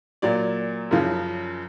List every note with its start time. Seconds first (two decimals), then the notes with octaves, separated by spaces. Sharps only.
0.22 A#2 F#3 D5
0.91 F#2 C#3 F3